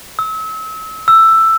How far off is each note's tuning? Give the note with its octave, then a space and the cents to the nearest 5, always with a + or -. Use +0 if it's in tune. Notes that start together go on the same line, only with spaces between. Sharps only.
E6 -35
E6 +10